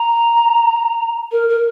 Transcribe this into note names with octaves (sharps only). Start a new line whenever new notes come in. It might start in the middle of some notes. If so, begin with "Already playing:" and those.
Already playing: A#5
A#4
A#4